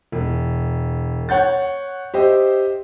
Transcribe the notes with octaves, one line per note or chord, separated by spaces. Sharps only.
E1
C#5 F#5 G6 A6
G4 C5 D#5 E5